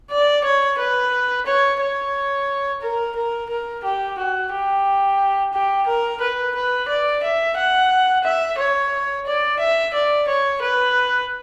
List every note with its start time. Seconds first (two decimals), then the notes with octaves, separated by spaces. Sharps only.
0.11 D5
0.44 C#5
0.78 B4
1.46 C#5
1.81 C#5
2.82 A#4
3.16 A#4
3.49 A#4
3.84 G4
4.18 F#4
4.52 G4
5.53 G4
5.87 A#4
6.21 B4
6.55 B4
6.88 D5
7.23 E5
7.57 F#5
8.24 E5
8.58 C#5
9.26 D5
9.59 E5
9.94 D5
10.28 C#5
10.62 B4